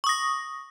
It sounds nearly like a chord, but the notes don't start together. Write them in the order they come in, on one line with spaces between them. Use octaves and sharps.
C#6 D#6 A#6